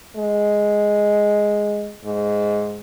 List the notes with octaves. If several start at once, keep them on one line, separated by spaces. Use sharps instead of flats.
G#3
G#2